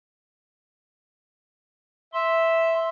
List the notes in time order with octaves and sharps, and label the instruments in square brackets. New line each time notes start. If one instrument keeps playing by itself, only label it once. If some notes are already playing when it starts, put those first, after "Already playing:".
[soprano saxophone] E5 [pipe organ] C6